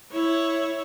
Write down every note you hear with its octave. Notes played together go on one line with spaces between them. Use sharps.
E4 C#5